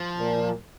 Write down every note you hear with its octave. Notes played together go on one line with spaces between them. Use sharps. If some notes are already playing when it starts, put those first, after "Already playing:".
Already playing: F3
A#2